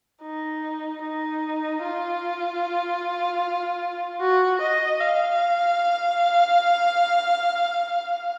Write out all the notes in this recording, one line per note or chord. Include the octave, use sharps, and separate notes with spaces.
D#4
D#4
F4
F#4
D#5
F5